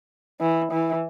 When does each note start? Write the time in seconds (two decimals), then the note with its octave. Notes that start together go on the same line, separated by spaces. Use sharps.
0.41 E3
0.72 E3